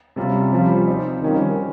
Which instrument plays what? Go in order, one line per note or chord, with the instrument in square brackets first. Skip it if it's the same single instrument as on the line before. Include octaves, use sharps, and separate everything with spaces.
[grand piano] C3 G3 C#4 F4
[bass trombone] F3 [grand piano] G3 C#4 G4
[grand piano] F3 C4 D#4
[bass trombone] D#3 [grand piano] G3 C#4 F4